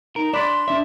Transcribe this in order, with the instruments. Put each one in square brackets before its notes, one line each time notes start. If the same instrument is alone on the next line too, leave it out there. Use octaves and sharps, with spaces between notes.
[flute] D#4 [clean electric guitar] A#4
[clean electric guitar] D4 [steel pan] D5 B5 [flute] C6
[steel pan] D4 D5 [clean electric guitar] E5